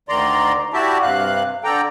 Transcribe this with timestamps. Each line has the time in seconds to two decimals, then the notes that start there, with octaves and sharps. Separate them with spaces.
0.09 D2 D#3 D5 A#5 C6
0.74 E4 F#4 G4 D5 E5 A5
1.02 G2 C3 F5 F#6
1.64 D3 A4 D5 G5 A#5